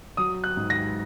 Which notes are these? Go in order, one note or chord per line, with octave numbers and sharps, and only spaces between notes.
F#3 D#6
F#6
G#2
A#6